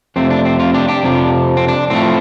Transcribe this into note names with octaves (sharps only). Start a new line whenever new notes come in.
F2 C3 A3 C4
D4
C4
C4 F4
D4 G4
D4 G4
F2 C3 F3
C4
D4
A2 F3 A3 C4